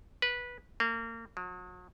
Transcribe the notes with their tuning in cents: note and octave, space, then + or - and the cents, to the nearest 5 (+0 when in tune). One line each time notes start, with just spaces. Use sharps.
B4 -15
A#3 -30
F#3 -40